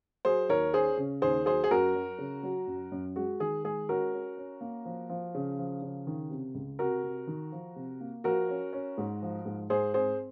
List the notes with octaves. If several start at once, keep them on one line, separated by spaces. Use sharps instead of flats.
F#3 G#4 C5
D#2 A#4 C#5
C#4 G#4 C5
C#3
D#2 G#4 C5
F#3 G#4 C5
G#4
F#2 F#4 A#4
F#3
C#3
F#3
F#2
F#2
G#3 F#4
D#3 G#4
G#3 G#4
C#4 F#4 A#4
C#4
C#4
A#3
F3
F3
C#3
F3
C#3
D#3
C3
C#2
C3 F#4 A#4
C3
D#3
F3
C3
A#3
F3 F#4 A#4
C#4
C#4
G#2
F3
G#2
G#2 G#4 C5
C4 G#4 C5